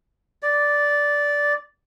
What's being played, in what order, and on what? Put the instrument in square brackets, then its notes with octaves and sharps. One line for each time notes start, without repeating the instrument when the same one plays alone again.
[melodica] D5